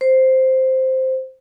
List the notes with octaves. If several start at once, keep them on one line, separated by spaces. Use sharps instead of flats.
C5